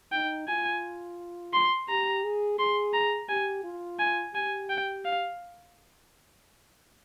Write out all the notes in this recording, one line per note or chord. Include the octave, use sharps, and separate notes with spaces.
D#4 G5
F4 G#5
C6
G4 A#5
G#4
G#4 C6
A#5
G4 G#5
F4
G#5
G4 G#5
G5
F5